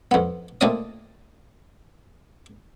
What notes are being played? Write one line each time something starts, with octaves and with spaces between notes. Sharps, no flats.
F2 B3
A#2 A3 C4 D5 D#5 D#6